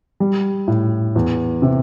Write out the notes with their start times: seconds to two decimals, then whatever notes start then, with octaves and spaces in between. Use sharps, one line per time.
0.20 G3
0.68 A2
1.16 E2
1.62 C3